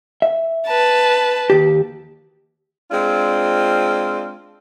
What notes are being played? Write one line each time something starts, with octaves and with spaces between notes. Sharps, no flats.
E5
B4 A5
D#2 G4
G#3 C4 D4 F4